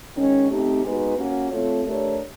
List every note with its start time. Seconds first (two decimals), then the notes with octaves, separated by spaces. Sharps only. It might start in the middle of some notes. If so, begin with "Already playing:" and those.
0.17 D#3 G#3 C#4
0.50 A3 C4 D#4 G4
0.84 G#3 B3 D#4 F#4 B4
1.17 A#3 C#4 F#4
1.52 A3 C4 F4 A4 C#5
1.85 A3 D4 G4 A#4 C#5